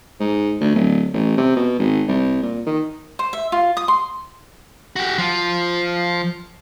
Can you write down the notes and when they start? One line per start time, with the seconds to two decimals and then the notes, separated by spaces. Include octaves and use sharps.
0.20 G#2
0.60 D2
0.75 D1
1.13 A1
1.37 C3
1.56 B2
1.79 G#1
2.08 C2
2.42 A#2
2.66 D#3
3.19 C5
3.33 E5
3.52 F4
3.77 D#6
3.88 C6
4.96 F#4 G4
5.18 F3